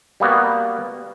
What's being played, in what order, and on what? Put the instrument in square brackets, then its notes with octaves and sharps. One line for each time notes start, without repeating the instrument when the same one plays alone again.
[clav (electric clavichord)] G3 A#3 B3 F#4